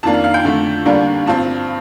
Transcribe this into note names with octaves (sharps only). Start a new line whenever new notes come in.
F2 D#3 A#3 D4 A5
F5
F5
G5
F2 D3 A3
D#2 D3 G3 A#3 D4
G2 F3 C4 A5